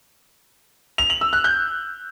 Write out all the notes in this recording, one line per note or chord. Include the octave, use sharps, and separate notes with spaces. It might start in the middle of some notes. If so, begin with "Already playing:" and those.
F7
F#7
E6
F#6
G6